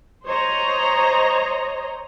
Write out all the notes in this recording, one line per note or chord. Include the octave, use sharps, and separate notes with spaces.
C5 C#5 D#5 A#5